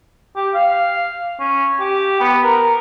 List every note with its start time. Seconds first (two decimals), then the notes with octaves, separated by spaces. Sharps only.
0.36 G4
0.54 F5
1.40 C#4
1.80 G4
2.20 B3
2.44 A#4